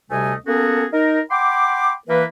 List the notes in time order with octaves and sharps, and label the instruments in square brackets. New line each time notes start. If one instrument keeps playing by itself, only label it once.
[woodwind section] D2 C3 G3 A3 D#5 G#5
A#3 B3 C#4 F#4 G#4 A4
D#4 A#4
F#5 G5 B5 C6 D6
E3 A#3 B4